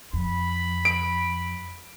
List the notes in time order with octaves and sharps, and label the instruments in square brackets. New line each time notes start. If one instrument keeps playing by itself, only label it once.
[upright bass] F2 [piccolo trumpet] B5
[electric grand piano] D7